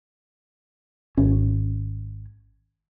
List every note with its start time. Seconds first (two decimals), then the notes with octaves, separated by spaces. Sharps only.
1.17 G#1 C#4